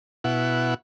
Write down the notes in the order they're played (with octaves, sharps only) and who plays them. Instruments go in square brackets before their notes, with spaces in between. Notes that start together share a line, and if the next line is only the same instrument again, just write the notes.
[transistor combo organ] B2 E4 F#5